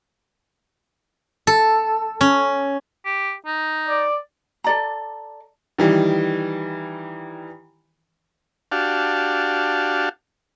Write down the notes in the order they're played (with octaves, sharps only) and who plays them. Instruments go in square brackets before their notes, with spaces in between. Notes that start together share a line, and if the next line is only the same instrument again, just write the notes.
[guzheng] A4
C#4
[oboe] G4
D#4
[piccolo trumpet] D5
[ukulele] A4 D5 A#5
[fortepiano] D#3 E3 G3
[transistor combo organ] D4 F#4 G4 F5 A5